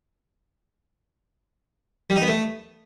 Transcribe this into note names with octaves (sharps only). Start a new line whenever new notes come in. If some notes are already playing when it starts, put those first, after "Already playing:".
G3
D#4
B3
A3